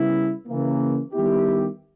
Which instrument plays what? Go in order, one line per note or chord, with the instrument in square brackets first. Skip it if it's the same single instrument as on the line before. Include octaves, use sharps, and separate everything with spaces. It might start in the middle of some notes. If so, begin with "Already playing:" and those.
Already playing: [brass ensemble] C#3 G3 B3 E4
C#3 E3 A#3
D#3 G3 B3 E4 G4